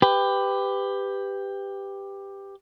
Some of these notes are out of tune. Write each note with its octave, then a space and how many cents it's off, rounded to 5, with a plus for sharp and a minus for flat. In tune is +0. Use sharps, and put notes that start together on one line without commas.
G4 +10 B4 +20